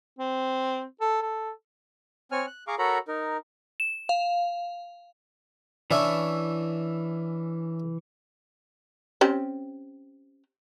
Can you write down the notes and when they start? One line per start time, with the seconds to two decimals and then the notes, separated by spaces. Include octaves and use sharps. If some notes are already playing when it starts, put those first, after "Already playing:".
0.19 C4
1.01 A4
1.22 A4
2.32 C4 C#5 G#5 F6
2.47 F#6
2.67 G#4 F5 A#5 C#6 D6
2.79 F#4 A4 A#4 C#5 A#5 B5
3.08 D#4 A#4
3.80 E7
4.09 F5
5.91 E3 C#4 D4 E4 C#6
9.21 C4 C#4 G4